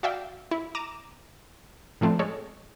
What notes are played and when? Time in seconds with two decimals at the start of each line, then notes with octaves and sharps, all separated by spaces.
0.03 F#4 D5 E5 F5 G5
0.51 E4
0.75 A#5 D6 D#7 E7
2.01 A2 F3 A3 C4 D4
2.19 G#3 A4 C#5